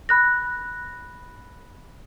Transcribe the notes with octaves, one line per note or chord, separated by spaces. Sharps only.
B5 F#6 A#6